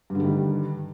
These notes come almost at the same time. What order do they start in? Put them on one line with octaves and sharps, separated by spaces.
G2 D3 G3 D#3